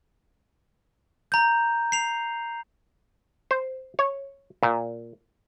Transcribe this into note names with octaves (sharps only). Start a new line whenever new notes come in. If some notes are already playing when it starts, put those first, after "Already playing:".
A#5 G6
C7 F7
C5
C#5
A#2